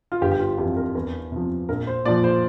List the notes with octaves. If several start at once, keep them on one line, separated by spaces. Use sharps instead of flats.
F4
G1 G4
G4
F4
F2 E3 G4
A#4
E2 A#4
C3 F3
A#1 A#4
C5
A#2 F3 D5
C5